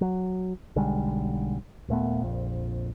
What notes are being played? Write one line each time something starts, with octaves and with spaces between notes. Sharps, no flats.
F#3
B1 D3 G3 G#3
D#1 A#2 A3 B3
A#1 F2